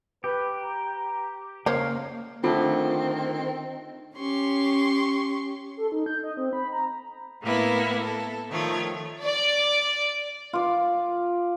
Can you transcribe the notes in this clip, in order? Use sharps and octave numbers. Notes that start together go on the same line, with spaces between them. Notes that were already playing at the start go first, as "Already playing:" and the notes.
G4 B4
A#5
C#3 A#3 A#4 C5 C#5 F5
D3 D#3 F3 A3 C4 F4 A4
C#4 G4 C6 C#6
A4
D#4
G6
D#5
C4
B5
A#5
A2 A#3 B3 E4
A4
D#3 F3 A3 C#5
D5
F4 D5